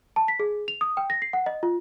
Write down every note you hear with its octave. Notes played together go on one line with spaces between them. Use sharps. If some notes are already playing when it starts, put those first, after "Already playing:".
A5
B6
G#4
F7
D#6
G5
A#6
C7
F#5
D#5
F4